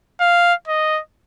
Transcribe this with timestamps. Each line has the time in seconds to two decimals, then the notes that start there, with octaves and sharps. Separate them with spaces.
0.20 F5
0.67 D#5